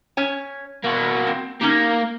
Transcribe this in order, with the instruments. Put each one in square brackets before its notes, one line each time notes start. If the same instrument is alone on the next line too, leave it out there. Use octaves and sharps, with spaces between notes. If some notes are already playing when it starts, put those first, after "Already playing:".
[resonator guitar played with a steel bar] C#4 C#5 G#5
[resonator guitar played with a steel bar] B2 [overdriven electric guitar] A#3 F#4
[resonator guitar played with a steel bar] C4
[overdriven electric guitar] A#3 [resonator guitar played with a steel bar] C#4 D#4 G4